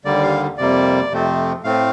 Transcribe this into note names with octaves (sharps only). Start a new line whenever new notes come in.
D#2 D3 G3 A#3 D5
F5
F2 C3 G3 A#3 D5
F2 C3 F3 A3 C4
A2 A3 C4 F5